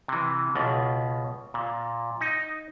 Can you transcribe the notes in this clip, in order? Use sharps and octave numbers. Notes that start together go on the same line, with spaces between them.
C3 E3
C#2 B2
A#2
D#4